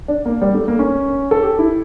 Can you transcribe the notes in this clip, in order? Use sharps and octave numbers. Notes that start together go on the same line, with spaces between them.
D4
A#3
G3
A3
A#3
C#4
A4
G4
E4